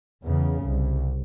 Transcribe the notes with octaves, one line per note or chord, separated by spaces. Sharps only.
E2 C#3
C2